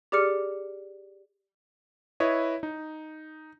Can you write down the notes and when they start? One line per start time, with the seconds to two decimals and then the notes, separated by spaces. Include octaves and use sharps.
0.12 G4 G#4 D5 D6 F6 C#7
2.20 E4 B4 C#5 D#5
2.63 D#4